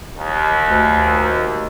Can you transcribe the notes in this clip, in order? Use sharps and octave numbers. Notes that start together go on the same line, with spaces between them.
D#2
D2